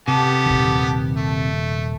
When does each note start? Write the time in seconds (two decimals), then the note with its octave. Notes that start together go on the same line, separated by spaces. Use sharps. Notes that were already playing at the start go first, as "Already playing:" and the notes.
0.08 C3 B3 G4 A4
0.46 D#1 D#3
1.16 A3